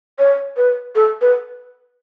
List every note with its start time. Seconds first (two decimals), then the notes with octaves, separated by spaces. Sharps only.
0.19 C#5
0.57 B4
0.95 A4
1.21 B4